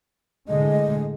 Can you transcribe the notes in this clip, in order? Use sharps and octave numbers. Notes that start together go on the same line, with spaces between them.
A2 D3 G#3 D#5